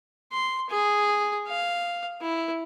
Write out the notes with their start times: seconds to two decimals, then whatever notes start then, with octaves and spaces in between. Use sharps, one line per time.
0.32 C6
0.69 G#4
1.47 F5
2.22 E4